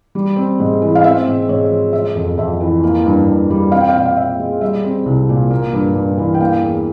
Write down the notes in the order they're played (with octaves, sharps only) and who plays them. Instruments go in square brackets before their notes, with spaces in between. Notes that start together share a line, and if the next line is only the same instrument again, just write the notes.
[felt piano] G3
C4
G#2
E3
F5
C4 E5
G#2
G#2 C#5
F3
G#3 E5
F2
F2 E5
E3
A#3
G2
G2
G3
C4 F5
G5
F5
A#2 G5
F5
A#2 E5
G#3
G3 E5
C4
C2
A#2
A#3
G2
G2
E3
G5
A#3 F5
E2